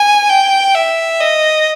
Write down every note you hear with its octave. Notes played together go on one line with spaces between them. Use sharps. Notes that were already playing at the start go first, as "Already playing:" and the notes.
Already playing: G#5
G5
E5
D#5